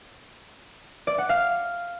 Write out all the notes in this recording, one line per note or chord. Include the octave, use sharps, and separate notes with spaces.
D5
F#5
F5